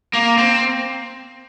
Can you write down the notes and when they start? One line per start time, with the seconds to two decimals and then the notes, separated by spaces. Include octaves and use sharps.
0.13 A#3
0.38 C4